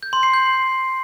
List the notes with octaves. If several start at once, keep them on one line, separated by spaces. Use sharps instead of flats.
G6
C6
C7
G6